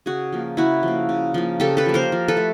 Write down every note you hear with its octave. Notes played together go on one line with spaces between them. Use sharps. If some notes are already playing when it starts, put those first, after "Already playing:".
C#3 F#4 G#4
F3 A#3
C#3 E4 F#4
F3 A#3
C#3
F3 A#3
C#3 G4 A4
A4 B4
F3 A#3
A#4 C5
F3
A4 B4
A3